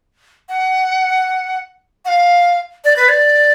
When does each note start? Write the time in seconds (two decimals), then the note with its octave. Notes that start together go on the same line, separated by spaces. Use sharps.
0.49 F#5
2.05 F#5
2.08 F5
2.84 D5
2.96 B4
3.09 D5